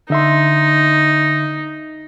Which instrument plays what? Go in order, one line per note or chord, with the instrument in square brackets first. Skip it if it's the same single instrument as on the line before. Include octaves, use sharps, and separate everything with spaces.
[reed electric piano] D3 E5 C6 [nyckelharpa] D#4